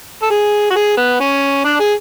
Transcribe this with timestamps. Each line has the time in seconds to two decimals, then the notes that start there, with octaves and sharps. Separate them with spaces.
0.23 A4
0.30 G#4
0.70 F#4
0.76 G#4
0.97 B3
1.20 C#4
1.64 D4
1.80 G#4